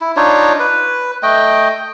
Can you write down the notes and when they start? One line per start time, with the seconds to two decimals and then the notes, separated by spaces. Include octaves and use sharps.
0.01 E4
0.16 D4 D#4 F4 C#5
0.60 B4
1.23 A3 D#5 G5